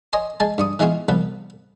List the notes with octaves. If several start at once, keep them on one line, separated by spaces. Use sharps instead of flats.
C#5 D#5 G#5 C6
G#3 G#5 A5
G2 C#6 D#6
E3 G#3 B3 F4 F#4
C2 F3 B3 B4